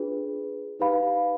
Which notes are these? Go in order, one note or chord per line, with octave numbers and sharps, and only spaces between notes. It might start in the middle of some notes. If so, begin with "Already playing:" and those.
Already playing: D4 F4 G#4 B4
D#4 G4 B4 F5 B5